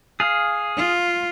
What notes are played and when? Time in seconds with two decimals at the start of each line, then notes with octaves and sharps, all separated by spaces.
0.20 G#4 F5
0.77 F4